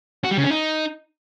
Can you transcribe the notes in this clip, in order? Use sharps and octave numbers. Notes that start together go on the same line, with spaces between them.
F#4
G3
C#3
C#4
D#4